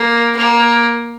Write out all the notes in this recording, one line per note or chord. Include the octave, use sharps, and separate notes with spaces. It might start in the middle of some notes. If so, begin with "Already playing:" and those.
Already playing: A#3
A#3